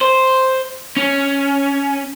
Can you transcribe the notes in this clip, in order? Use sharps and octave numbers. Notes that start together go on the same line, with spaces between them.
C5
C#4